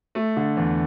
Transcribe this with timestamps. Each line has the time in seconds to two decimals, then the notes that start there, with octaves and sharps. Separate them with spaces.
0.15 A3
0.37 D3
0.57 E2